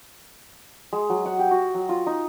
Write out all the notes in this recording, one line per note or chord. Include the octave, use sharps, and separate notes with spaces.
G#3
F#3
F#5
G4
F#4
F#3
F4
D#4